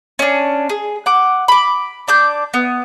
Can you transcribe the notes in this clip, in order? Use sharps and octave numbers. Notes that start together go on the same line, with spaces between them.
C#4 D4
G#4
F#5 D6
B5 D6
D4 D6 G6
B3